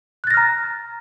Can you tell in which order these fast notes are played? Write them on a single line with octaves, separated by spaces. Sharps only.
F#6 A6 A#6 F6 A#5